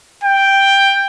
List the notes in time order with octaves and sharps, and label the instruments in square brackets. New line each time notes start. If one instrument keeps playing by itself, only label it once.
[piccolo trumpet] G5